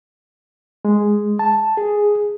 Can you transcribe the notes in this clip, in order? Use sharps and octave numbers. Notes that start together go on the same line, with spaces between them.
G#3
A5
G#4